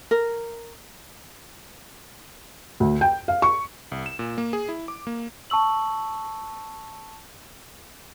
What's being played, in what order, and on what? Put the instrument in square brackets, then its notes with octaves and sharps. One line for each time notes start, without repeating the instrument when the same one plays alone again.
[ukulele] A#4
[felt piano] D2
G5
F5
C#6
[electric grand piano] C2
E7
A#2
A#3
G#4
E4
D6
A#3
[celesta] A5 C#6 E6 F#7